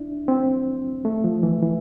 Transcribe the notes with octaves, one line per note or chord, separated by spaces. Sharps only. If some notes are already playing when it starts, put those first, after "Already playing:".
Already playing: D4 E4
C4
A3
F3
E3
E3